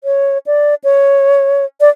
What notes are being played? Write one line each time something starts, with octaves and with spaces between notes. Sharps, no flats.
C#5
D5
C#5
D5